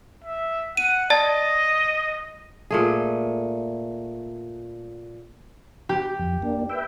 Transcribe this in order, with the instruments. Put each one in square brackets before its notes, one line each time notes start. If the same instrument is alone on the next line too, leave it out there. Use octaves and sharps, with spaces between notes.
[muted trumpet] E5
[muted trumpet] F#5 [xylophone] D#7
[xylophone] D5 A5 A6 [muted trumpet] D#5
[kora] A#2 A3 G#4
[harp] G4
[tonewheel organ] F2
A#3 D4
B4 E5 G5